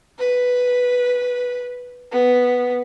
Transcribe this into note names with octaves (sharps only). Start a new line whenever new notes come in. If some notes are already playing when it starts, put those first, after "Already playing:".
B4
B3